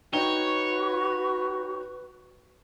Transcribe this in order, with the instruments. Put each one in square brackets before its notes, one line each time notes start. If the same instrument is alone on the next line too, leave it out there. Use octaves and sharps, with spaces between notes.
[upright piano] D#4 G5 G7 [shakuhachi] F#4 [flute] B4 [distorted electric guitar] C#5